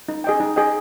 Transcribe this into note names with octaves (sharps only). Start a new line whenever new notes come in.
D#4
G#4 D#5 G5
D#4
G#4 D#5 G5